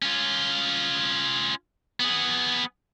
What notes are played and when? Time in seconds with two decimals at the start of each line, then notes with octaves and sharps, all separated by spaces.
0.02 C#4 F4
2.00 B3 G#4